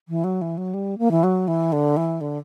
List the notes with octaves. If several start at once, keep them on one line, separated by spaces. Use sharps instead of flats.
E3
F#3
E3
F#3
G3
A#3
E3
F#3
E3
D3
E3
D3